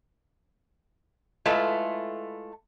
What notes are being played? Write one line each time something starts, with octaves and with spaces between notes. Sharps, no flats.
G#3 A3 E4 F4 B4 A5